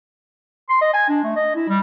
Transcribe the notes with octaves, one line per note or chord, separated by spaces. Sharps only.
C6
D#5
G#5
D4
A3
D#5
E4
G3